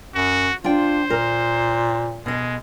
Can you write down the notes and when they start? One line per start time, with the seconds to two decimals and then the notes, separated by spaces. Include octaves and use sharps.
0.15 F#2 F#4
0.64 D4 F4 C5 G5
1.10 A#2 A#4
2.26 B2 G#3 D#5